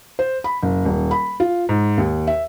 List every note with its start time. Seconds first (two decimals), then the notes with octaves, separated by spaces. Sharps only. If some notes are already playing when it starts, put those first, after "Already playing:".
0.19 C5
0.44 B5
0.62 F#1
0.85 D#1
1.11 B5
1.40 F4
1.69 G#2
1.98 D#2
2.27 E5